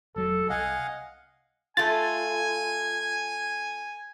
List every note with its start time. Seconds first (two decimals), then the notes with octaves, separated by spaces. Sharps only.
0.16 F1 F#3 A4
0.50 C2 D#5 F5 F#5 G#5
1.77 A3 F4 G#5 A6